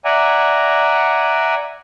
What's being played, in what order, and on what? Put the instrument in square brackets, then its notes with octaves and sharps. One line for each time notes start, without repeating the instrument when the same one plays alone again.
[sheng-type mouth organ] D5 E5 F#5 G#5 A#5